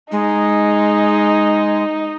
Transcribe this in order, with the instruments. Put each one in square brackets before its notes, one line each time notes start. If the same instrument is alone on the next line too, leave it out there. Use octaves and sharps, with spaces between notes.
[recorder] G#3 [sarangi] D#4